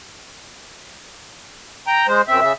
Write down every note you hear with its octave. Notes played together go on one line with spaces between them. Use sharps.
G5 A#5
G#3 C5
F#2 C4 E5
C#3 E5